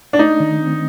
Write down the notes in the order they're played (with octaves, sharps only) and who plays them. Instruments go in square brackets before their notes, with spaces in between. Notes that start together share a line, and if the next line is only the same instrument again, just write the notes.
[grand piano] D4
[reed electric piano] A3 [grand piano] D#4
[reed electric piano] D#3
C4